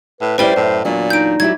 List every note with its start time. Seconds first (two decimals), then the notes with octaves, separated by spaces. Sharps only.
0.21 A2 B4
0.38 G3 C#4 E4 B4 C5 D5 G5 G7
0.56 F#2 A2
0.85 E2 A#2 F#3 D4
1.10 D#4 G6 D7
1.40 F#3 E4 G4 G#6